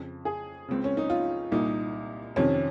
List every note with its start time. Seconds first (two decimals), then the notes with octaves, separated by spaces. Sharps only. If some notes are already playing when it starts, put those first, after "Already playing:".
Already playing: F2 C#3
0.25 G#4
0.68 C#2 C#3 C4
0.84 C#4
0.97 D#4
1.10 F4
1.52 C2 A#2 D#4
2.36 F2 C3 D#3 C#4